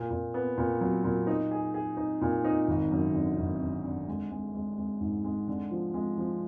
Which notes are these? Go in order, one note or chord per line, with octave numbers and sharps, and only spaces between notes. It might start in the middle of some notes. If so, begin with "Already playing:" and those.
Already playing: A#2
A#2
B3
A#2
F#3
A#2
D#4
G#4
G#4
D#4
A#2
D#4
G#1
F#2
D3
G#1
D3
D3
G#3
G#3
G#3
G#3
G#2
G#3
D3
F3
G#3
F3